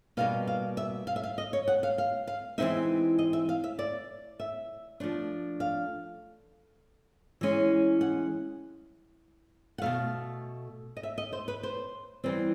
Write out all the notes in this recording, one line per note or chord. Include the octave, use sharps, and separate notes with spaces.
B2 G3 A#3 D#4 F5
F5
E5
F5
E5
F5
D#5
C#5
F#5
F5
F5
F5
E3 G#3 C4 D#4 E5
D#5
E5
F5
E5
D5
E5
F3 A3 D4
F5
E3 G#3 C#4
F#5
F#5
B2 F#3 A3 F5
D#5
E5
D#5
C5
B4
C5
E3 G3 C4